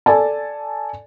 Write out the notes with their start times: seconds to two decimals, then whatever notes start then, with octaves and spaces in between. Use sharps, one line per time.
0.06 A4 D5 G#5 A5